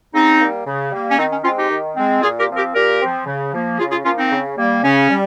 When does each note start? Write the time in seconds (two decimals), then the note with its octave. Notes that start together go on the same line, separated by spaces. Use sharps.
0.14 C#3 C4 D#4
0.40 G3 A#3
0.66 C#3
0.92 G3 A#3
1.11 C#4
1.18 D#3 C4 D#4
1.31 C#4
1.44 G#3 C4 C#4 F4
1.58 D#4 G4
1.70 D#3
1.96 G#3 C4
2.22 A#2 F4 G#4
2.39 G4 A#4
2.49 F3 C4
2.57 G4 A#4
2.75 A#2 G4 A#4
3.01 F3 C4
3.26 C#3
3.53 F3 A#3
3.78 C#3 F4 G#4
3.91 F4 G#4
4.05 F3 A#3 C#4 F4
4.18 C4 D#4
4.31 C#3
4.57 G3 A#3
4.83 C#3 C#4
5.10 G3